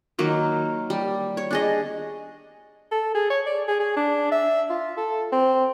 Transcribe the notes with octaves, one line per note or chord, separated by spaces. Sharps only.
D#3 F#3 A#3
G3
C#5
D4 G#4 D#5
A4
G#4
C#5
D5
G#4
G#4
D4
E5
F4
A4
C4